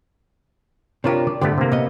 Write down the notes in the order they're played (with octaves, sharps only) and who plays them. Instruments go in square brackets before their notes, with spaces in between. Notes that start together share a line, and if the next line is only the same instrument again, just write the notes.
[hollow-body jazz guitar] C3 D4 F4 [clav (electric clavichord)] G4 A#4 C#5
[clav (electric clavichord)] D5
[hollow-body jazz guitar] B1 G#2 D3 [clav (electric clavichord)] A3 B3 G4
[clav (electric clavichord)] C3 A#3
[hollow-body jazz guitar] A#2 B3 D#5